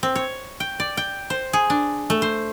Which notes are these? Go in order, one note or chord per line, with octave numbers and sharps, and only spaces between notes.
C4
C#5
G5
D5
G5
C5
G#4
D4
A3
C5